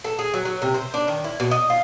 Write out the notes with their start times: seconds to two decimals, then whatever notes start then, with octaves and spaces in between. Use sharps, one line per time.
0.04 A4
0.19 G#4
0.34 F#3
0.45 F#3
0.62 C3
0.74 C5
0.94 D4
1.08 D#3
1.24 E4
1.40 B2
1.51 D#5
1.70 F4